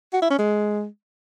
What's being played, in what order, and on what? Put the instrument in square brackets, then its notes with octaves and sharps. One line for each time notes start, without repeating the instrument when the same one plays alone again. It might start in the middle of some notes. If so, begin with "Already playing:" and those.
[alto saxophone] F#4
E4
C#4
G#3